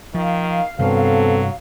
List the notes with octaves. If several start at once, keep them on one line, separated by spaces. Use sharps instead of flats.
D#3 F3 F5
G2 C3 F#3 B3 C4 A4